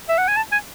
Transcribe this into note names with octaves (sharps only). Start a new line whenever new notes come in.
E5
F#5
G#5
A5
G#5